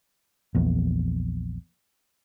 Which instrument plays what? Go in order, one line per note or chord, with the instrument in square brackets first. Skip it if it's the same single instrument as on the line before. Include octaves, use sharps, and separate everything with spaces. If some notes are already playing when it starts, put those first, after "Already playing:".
[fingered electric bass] A#1 E2